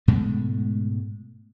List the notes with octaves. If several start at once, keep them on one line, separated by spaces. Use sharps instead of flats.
G#2 B2 G#3 A3